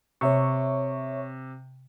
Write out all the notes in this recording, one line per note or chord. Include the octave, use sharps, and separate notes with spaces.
C3 C#5 E5 C#6